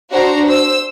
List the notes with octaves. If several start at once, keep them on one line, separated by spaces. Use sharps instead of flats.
D4 F#4 C5 A#5
C5 E6